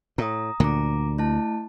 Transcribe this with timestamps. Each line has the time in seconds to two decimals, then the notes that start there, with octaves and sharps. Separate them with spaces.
0.18 A2 A#5 D#6
0.60 D2 A#2 D3 A#5 D6
1.18 A3 E4 A5